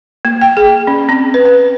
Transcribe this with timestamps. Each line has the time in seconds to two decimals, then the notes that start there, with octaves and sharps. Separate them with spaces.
0.25 A#3
0.41 G5
0.57 G#4
0.87 C#4
1.09 C4
1.34 B4
1.45 B4